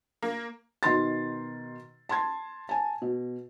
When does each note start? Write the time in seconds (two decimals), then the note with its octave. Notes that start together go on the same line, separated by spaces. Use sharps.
0.22 A#3
0.83 B2 D#3 C6 A6
2.09 A5 C6 G#6
2.69 G#5 A5
3.02 B2